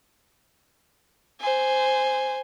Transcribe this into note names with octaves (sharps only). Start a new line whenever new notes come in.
C5 G#5